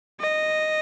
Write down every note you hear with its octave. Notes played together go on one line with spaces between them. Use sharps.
D#5